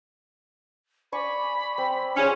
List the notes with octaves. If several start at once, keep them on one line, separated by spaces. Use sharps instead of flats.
D5 G#5 B5 C#6
C4
C#4 F4 G#4